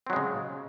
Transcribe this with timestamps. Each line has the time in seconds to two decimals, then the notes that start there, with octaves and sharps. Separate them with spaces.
0.07 C4
0.10 F#3
0.13 G#3
0.16 C#3